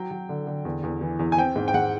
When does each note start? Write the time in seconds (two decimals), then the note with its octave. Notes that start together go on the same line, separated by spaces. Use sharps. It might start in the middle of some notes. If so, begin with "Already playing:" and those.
Already playing: F#3 G5
0.11 F#3
0.29 D3
0.47 D3
0.65 E2
0.83 E2
1.01 E3
1.19 E2
1.32 G#5
1.38 C4 G5
1.56 G#2
1.68 G5
1.74 G#2 F#5